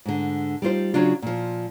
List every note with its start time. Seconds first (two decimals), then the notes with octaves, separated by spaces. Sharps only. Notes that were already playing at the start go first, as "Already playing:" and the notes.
0.05 G#2 D3
0.62 G3 D#4 F4 C5
0.94 C#3 F#3 D4 F4
1.22 A#2 F3